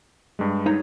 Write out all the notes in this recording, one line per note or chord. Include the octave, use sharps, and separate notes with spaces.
G2 G3 G#3
D#4 C#5 A#5